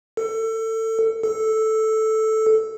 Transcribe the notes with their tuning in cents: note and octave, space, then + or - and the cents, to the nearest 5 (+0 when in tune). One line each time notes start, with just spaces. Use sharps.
A4 +25
A4 -5